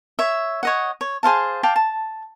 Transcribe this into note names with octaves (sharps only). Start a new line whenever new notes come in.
C#5 E5
C#5 D#5 F#5
C#5
G#4 C5 F5 A5
F5 G5 A5 D6
A5